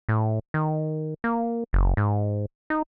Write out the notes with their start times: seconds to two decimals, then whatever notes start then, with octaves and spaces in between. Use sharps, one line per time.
0.09 A2
0.54 D#3
1.24 A#3
1.73 F#1
1.97 G#2
2.70 D#4